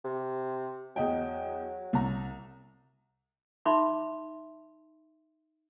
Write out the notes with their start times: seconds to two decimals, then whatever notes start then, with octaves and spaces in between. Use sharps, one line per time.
0.05 C3
0.96 E2 F#3 D#5 G5
1.93 C2 A#5
3.66 D#4 E5 B5 C6 D6